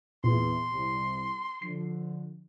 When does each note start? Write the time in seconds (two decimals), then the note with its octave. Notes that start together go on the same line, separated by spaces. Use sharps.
0.24 E2 A#2 C6
0.71 C2
1.62 D3 F3 C7